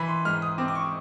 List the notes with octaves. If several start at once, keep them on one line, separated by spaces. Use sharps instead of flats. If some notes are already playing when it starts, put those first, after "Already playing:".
Already playing: E3 B5
C6
G#2 F6
D#6
C4 D6
D6
C#6